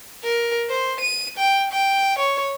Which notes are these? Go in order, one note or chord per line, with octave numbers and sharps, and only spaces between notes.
A#4
C5
D#7
G5
G5
C#5